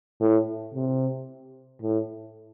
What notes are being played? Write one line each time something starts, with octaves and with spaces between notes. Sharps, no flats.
A2
C3
A2